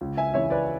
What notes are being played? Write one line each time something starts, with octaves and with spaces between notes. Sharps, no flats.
C#2
E5 G#5
C#3 E3 C#5 E5
B4 D5